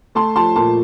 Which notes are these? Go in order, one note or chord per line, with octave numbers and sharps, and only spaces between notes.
A3 A5 C6
F3 A5 C6
A#2 A5 C6